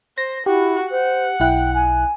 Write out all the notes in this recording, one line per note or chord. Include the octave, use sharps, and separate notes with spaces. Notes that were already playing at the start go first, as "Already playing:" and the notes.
C5 A#6
E4 F#4 G4
C5 F#5
B1 E4 G5 F#6
G#5